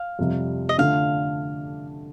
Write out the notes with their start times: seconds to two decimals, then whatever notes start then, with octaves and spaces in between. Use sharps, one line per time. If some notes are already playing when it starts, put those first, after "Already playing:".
Already playing: F5
0.19 F2 C3 G3
0.69 D#5
0.78 D3 A3 D4 F4 F5